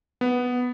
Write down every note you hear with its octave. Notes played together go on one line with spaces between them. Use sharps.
B3